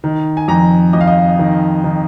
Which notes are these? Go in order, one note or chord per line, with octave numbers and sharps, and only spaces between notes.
D#3
G#5
F2 A#5
F2 D#5
F5
D#5
D#3
D#3